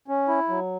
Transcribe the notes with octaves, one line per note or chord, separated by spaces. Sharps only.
C#4
E4
F#3